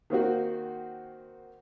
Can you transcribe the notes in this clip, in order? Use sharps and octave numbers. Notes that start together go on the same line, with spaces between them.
D#3 A#3 C4 F#4